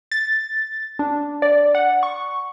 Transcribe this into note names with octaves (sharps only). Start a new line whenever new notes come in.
A6
D4
D5
F#5
C#6